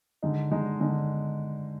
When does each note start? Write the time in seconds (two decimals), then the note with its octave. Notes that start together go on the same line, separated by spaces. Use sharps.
0.23 D3 G#3 D#4
0.52 D3 G#3 D#4
0.80 D3 G#3 D#4